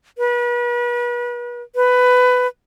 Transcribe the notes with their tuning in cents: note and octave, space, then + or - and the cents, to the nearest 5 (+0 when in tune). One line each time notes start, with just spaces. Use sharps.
B4 -35
B4 +15